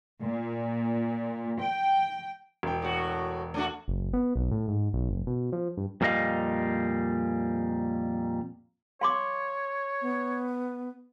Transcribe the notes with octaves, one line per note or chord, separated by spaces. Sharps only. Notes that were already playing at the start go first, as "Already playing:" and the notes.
A#2
G5
E1 G5
A2 F#4
A3 D4 F#4
F#1
B3
B1
A2
G#2
B1
F#1
B2
F3
G2
F2 A#2 G3 B3 D#5 F5
C#5 F5 C6 D6
B3